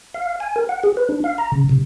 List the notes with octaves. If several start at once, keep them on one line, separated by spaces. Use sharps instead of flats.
F5
G#5
A#4
F#5
G#4
B4
D4
F5
A#5
C#3
C3